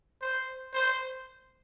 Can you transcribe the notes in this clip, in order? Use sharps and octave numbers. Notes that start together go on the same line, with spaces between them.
C5
C5